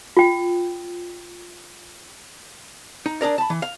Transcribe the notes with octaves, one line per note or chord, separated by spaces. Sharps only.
F4 G5
D#4
D4 G#4 A#4 D5
A5 B5
E3
F5